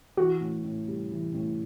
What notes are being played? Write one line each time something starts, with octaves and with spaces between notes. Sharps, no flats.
E3 F#4
A2
A2
G3
E3
A2